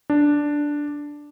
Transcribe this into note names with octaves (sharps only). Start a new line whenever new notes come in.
D4